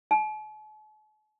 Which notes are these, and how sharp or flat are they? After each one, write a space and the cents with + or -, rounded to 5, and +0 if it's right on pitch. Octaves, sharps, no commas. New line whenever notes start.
A5 -45